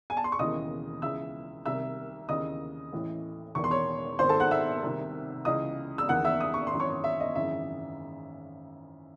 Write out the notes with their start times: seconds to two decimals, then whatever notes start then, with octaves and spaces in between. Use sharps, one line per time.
0.10 G#5
0.17 A5
0.24 C6
0.32 C#6
0.38 E1 D#2 C#3 E3 D#5 D#6
1.02 C#2 C#3 E3 E5 E6
1.66 C2 C3 D#3 E5 E6
2.29 D#2 C#3 E3 D#5 D#6
2.92 A1 A2 E3
3.55 E1 E2 D#3 C#6
3.64 C6
3.71 C#5 C#6
4.19 G#1 G#2 D#3 C5 C6
4.29 A4 A5
4.40 F#5 F#6
4.51 E5 E6
4.82 C2 C3 D#3
5.45 C#2 C#3 E3 D#5 D#6
5.98 E6
6.09 F#1 E2 D#3 F#5 F#6
6.25 E5 E6
6.40 D#6
6.54 C#6
6.67 C6
6.72 G#1 F#2 E3
6.80 C#5 C#6
7.04 E5
7.20 D#5
7.35 G#1 F#2 C#3 E3 E5